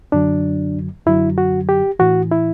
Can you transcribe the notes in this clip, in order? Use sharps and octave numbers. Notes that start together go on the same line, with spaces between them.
F#2 D3 F#3 D4
F#2 D3 F#3 E4
F#4
G4
A2 E3 F#4
E4